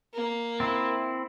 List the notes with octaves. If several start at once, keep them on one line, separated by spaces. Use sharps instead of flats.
A#3
C4 E4